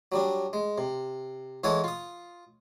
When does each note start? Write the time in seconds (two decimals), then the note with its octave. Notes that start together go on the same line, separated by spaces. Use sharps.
0.12 F#3 G3 D4
0.53 G#3
0.78 C3
1.64 E3 G#3 A4 C#5 F#5 D#6
1.84 F4 D#6